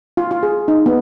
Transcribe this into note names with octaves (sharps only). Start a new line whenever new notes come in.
F4
F4
G#4
D#4
B3